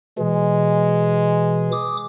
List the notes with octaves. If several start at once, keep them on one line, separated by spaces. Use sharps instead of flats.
B2 E3 G#3
D6 D#6